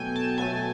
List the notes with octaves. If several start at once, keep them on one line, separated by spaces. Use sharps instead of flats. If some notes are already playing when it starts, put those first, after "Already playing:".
Already playing: B2 F#3 A3 G5 G#5
A5
B2 F#3 A3 G#5